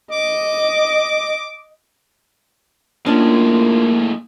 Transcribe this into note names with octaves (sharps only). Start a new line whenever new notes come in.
D#5 D6
A2 G#3 A#3 C#4 D4 F4